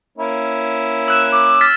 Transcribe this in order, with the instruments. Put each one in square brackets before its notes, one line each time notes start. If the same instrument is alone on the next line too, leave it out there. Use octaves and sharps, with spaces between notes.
[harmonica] A#3 C#4 E4
[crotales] E6 F#6 E7
[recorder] D6 [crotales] F#6
[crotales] F6 A6 B6